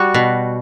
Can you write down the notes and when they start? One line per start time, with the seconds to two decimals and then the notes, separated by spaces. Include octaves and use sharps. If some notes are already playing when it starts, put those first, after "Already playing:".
Already playing: G3 F#4
0.14 B2